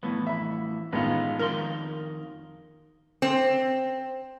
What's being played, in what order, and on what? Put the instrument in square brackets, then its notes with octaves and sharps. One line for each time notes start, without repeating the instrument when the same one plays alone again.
[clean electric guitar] F2 A2 E3 [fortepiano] B3
[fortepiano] E5 B5
[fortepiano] A1 D#3 B3 [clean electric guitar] G#3 F4
[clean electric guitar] F2 D#3 C6 [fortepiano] A#4
[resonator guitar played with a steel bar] C4